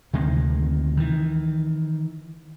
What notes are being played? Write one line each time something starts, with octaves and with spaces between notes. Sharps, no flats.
D2 C3 D#3 G#3
D#3 E3